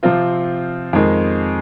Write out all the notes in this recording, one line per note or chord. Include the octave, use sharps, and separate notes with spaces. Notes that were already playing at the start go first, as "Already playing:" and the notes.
C3 F3 C4 F4
F2 D#3 G#3